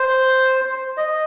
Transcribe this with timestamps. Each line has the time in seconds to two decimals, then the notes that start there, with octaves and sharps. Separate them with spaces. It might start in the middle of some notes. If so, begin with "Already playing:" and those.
Already playing: C5
0.97 D#5